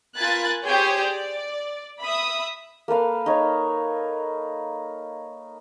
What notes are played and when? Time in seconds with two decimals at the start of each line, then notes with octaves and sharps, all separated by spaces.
0.16 F4 A#4 G#5 B5 F#6 A6
0.65 G4 G#4 C5 C#5 G5 G6
1.04 D5
2.00 E5 B5 D#6
2.88 A#3 A4 B4 F5
3.26 D#4 C#5